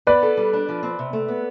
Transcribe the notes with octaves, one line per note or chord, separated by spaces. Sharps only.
B3 B4 D5
A4
G3
D4
F3
C4
C3
A3
B3